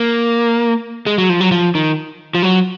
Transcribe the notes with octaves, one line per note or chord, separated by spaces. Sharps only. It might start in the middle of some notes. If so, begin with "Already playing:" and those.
Already playing: A#3
G#3
F#3
F3
F#3
F3
D#3
F3
F#3